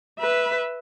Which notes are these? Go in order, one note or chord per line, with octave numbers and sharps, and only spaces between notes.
B4 E5